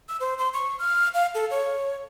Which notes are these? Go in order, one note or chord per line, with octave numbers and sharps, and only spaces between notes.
E6
C5
C6
C#6
F6
F5
A4
C#5